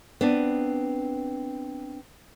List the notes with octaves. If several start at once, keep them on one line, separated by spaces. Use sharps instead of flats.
B3 C4 D4